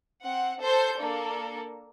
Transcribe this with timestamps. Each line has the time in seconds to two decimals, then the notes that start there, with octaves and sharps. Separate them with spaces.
0.22 C4 F#5
0.61 A4 C5 C6 G6
0.99 A#3 D4 A4